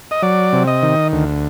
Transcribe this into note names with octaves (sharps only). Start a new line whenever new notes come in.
D#5
F#3 D5
C3
D#5
D#3
D2